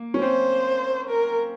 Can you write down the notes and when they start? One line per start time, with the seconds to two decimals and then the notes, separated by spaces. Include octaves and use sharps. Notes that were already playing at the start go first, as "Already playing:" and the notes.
Already playing: A#3
0.14 C#4
0.21 C4 C5
1.10 A#4